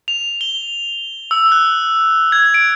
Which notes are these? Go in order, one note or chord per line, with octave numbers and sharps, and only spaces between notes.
F7
G7
E6
F#6
G#6
D7